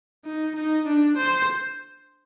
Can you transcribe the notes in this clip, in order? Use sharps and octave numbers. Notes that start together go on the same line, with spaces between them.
D#4
D#4
D4
C5